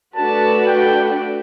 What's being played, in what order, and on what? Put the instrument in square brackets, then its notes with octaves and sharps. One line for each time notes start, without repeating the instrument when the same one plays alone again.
[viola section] A3 D4 F#4 B4 [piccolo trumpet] A5
[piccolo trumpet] G5